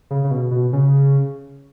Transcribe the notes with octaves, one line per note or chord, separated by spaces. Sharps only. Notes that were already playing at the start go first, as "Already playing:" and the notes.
C#3
C#3
B2
B2
C#3